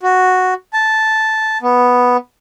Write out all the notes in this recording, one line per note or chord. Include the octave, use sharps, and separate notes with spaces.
F#4
A5
B3